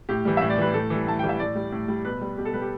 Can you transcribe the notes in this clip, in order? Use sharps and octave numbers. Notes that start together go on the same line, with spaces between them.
A2 G4
E3 G3
A2 E5
D5
E3 G3 B4
A2 A4
E3 G3
A2 A5
E3 G3 G5
E5
A2 D5
G3
A2
G3
B2 B4
G3
B2 G4
A4
G3 B4
G4